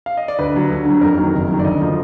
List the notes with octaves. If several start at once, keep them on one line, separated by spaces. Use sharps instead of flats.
F5
D#5
D5
D2 B4
D3 F#3
D2
D3 F#3
F2 A#4
D#3 F#3
F#1
F#2 D#3 F#3
D5
D2 D#5
D3 F3